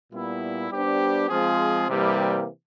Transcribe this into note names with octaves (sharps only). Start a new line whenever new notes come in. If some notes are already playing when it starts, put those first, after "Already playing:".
A#2 G3 B3 E4
G3 B3 D4 G4 C5
F3 G#3 C4 F4 G#4
C3 E3 G3 A#3